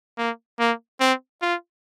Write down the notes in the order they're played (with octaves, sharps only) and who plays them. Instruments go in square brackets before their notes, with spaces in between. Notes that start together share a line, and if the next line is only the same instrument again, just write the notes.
[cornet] A#3
A#3
C4
F4